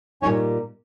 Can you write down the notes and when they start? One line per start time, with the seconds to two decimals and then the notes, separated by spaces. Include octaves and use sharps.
0.22 A#2 G3 A#3 C#4 D#4 C#5